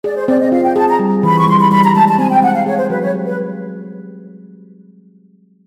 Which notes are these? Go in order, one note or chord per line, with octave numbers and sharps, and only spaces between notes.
G#4 D5
C5
C4 D5
D#5
F4 F5
G5
G#4 A5
A#5
G3
E3 B5
C#6
G3 C6
B5
G3 B5
A#5
G#3 A5
A5
C4 G#5
G5
G#3 F#5
F5
G#4 C#5
C5
F#3 B4
C#5
G4
B4